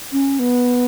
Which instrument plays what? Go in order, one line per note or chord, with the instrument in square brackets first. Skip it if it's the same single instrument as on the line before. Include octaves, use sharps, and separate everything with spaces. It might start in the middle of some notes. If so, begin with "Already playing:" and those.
[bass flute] C#4
B3